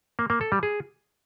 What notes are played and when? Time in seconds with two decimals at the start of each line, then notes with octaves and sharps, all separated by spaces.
0.19 A#3
0.30 A#3
0.41 A4
0.52 G3
0.63 G#4